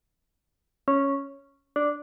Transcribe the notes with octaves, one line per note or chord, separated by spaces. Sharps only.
C#4
D4